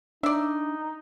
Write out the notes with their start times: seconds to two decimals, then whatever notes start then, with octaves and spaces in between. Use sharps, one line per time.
0.23 D4 D#4 D5 E5